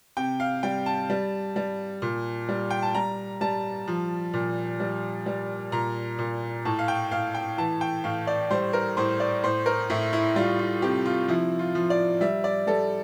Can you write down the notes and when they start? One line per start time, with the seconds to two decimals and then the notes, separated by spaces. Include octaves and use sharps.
0.17 C3 G5
0.40 F5
0.63 G3 G5
0.86 A5
1.10 G3
1.56 G3
2.02 A#2
2.49 G3
2.70 G5
2.82 A5
2.95 G3 A#5
3.41 G3 A5
3.87 F3
4.34 A#2
4.80 G3
5.26 G3
5.72 A#2 A#5
6.19 A#2
6.65 A2 A5
6.79 F5
6.88 G5
7.11 A2 F5
7.35 G5
7.58 E3 A5
7.81 G5
8.04 A2 F5
8.27 D5
8.50 G3 C5
8.73 A#4
8.97 A2 C5
9.20 D5
9.43 A2 C5
9.66 A#4
9.90 A2 E4
10.13 E4
10.36 G3 F4
10.59 F4
10.82 C3 G4
11.06 F4
11.28 F3 E4
11.59 F4
11.75 F3
11.90 D5
12.21 G3 E5
12.44 D5
12.67 G3 A4